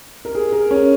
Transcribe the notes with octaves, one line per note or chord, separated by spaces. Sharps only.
A#4
G#4
A#4
C#4